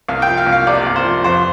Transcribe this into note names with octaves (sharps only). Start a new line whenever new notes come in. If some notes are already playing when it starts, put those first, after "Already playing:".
C2 F5
G5
F3
F5
C2
F5
C3 D5
C2
C5
F3
F2 C5